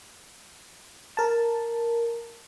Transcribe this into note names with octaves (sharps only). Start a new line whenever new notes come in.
A#4 A5